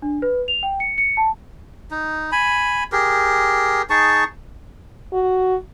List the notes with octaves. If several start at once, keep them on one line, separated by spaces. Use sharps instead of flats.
D4
B4
F7
G5
C#7
C#7
A5
D#4
G#5 B5
G4 G#4 A#4
D#4 G#4 A5 C#6
F#4